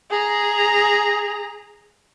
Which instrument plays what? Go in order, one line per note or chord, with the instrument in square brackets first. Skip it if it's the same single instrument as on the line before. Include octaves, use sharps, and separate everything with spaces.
[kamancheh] G#4 A#5